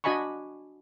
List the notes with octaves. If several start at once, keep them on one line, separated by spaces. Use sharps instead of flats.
D4 F#4 D#5 G#5 B5 C#6